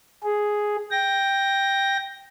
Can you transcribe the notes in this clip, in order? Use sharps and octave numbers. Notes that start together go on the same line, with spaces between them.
G#4
G5 A#6